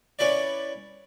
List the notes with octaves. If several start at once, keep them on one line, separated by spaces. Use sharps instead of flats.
C#4 E4 B4 D5